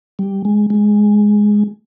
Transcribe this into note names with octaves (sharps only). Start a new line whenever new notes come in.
G3
G#3
G#3